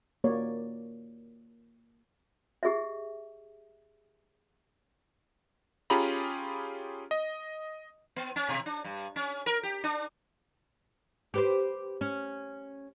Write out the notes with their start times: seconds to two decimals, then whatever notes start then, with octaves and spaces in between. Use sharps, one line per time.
0.24 A#3 C#5 D5
2.63 G4 G#4 D#5 E5
5.90 C#4 F4 G4 G#4 A#5 B5
7.11 D#5
8.16 B3
8.36 C#4
8.49 B2
8.66 D4
8.84 G2
9.16 C#4
9.46 A#4
9.63 G4
9.84 D4
11.34 G4 B4 C5
12.01 C#4